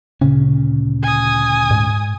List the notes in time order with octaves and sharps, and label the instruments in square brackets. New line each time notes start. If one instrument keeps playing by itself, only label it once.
[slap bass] D2 A#2 C#4 [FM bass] C#3
[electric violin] G#5 D#6
[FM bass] G#2